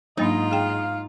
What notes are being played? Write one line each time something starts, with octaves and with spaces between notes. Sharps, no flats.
G#2 F#3 A#3 D4 D#4 F4 D#5
G#4 F5 G5